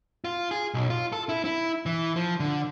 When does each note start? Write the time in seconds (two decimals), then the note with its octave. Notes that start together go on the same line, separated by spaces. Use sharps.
0.24 F4
0.51 G#4
0.74 B1
0.90 F4
1.12 A4
1.29 E4
1.45 E4
1.86 E3
2.16 F3
2.40 D3